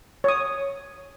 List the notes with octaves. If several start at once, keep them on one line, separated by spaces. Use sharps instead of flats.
C#5 D#6